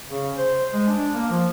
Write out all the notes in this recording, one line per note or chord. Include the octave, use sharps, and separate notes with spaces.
C#3
C5
G#3
D4
A#3
F3